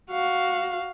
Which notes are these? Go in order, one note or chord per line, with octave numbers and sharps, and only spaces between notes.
F#4 F5